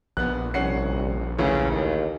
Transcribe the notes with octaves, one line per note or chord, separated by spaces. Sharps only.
A#1 B3 F#6
C2 C#4 F#5 C7
D2 C#3 E3
D#2